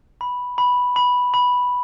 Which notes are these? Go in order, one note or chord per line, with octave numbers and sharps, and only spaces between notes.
B5
B5
B5
B5